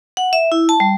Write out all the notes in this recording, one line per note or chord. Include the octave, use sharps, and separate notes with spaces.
F#5
E5
E4
A5
G3